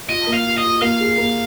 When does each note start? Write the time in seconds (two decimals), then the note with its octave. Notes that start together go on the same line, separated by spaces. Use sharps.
0.09 F4 D#5
0.27 A#3
0.34 F5
0.46 F4
0.58 D#5
0.64 F4
0.82 A#3 F5
1.00 G#4
1.18 A#3